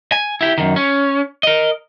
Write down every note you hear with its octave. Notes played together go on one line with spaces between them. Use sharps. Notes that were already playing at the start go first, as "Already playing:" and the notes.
G#5
E4 G4
F#2 D#3
C#4
A#4 D#5